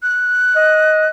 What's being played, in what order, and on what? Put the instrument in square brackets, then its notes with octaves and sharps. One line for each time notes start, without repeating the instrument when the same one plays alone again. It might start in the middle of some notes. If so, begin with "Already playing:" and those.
[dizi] F#6
[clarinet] D#5